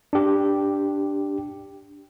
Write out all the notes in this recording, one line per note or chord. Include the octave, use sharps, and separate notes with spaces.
D4 G4